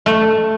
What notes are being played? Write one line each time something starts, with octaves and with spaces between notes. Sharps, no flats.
A3